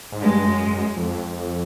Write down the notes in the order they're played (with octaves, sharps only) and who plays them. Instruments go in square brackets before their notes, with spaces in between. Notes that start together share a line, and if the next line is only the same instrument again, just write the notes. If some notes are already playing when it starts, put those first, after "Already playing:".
[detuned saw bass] G#2
[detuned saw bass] G2 [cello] G#3
[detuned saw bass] F#2
F#2
F2